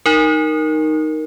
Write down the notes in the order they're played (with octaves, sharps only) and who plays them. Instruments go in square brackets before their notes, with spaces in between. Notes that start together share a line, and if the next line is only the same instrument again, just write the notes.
[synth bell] D#4 A#4